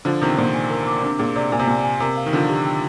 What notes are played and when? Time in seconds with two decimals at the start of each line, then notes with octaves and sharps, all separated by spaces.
0.05 D3 F3 C5
0.21 C3 D#3 C5
0.38 A#2 D3 C5
0.54 G#5
0.70 A#4
0.87 D6
1.03 C3 D4
1.19 A#2 G#4
1.36 C3 D5
1.52 A#2 G#5
1.59 C3
1.67 A#2 G#5
1.84 G#5
2.00 C3 A#4
2.17 F5
2.26 D#3
2.33 D3 F3 F4
2.49 G4
2.66 G5